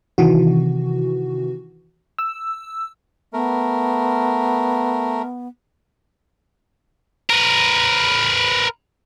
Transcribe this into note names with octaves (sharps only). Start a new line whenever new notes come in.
C3 D#3 E3 F#4
E6
A3 B3 A#4
A#4 B4